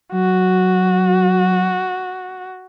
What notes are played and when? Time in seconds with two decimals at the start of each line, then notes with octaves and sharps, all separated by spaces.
0.13 F#3 F#4